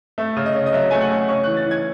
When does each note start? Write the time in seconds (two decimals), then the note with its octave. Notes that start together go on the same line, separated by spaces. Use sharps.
0.18 A3 E5
0.36 C#3
0.46 D#5
0.55 C#4
0.66 D#5
0.73 F#3 E5
0.91 A3 G#5
1.01 F#5
1.11 C#3
1.29 C#4 C#6
1.44 F#6
1.47 E3
1.57 A6
1.66 E3
1.71 G#6